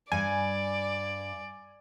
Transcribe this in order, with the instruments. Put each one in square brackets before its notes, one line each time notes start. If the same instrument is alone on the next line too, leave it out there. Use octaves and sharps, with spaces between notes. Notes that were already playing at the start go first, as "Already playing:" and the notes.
[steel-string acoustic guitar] G2 [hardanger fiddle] D5 [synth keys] G#5